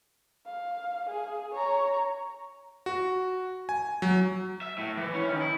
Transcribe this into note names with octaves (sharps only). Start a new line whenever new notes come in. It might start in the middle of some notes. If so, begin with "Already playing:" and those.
F5
G#4
C#5 A#5
F#4
G#5
F#3
E5
A2
E3
C#4
D#3
E4